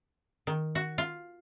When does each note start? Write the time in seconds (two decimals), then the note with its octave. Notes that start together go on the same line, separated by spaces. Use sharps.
0.47 D#3
0.75 F#4
0.98 F4